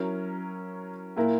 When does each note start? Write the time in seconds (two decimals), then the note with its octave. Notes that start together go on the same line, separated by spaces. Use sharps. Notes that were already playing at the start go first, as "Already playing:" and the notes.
Already playing: F#3 C#4 E4 A#4
1.16 A#2 A#3 E4 A#4